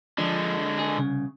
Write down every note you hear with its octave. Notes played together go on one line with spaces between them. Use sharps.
D3 F3 G#3 D4
G#4
C2 C#3